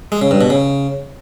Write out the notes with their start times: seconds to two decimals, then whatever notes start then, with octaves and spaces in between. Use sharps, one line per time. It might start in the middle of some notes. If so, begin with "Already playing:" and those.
0.12 G#3
0.21 C#3
0.31 G2
0.41 B2
0.50 C#3